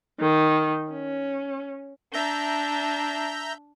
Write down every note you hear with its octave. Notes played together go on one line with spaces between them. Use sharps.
D#3
C#4
D4 E5 A#5 G6